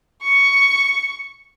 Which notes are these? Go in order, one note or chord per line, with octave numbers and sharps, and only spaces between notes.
C#6